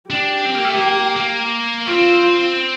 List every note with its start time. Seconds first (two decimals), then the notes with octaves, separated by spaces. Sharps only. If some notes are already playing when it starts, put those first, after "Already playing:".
0.10 D4 G4
0.45 C4
0.55 A#3
0.65 A3
0.73 A#3
1.16 A#3
1.87 C4 F4